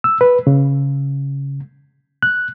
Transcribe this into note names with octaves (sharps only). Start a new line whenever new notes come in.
E6
B4
C#3
F#6